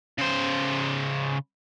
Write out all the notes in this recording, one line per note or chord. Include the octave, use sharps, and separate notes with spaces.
C#3 C5